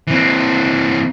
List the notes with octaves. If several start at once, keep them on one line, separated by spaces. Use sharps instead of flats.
E3 C4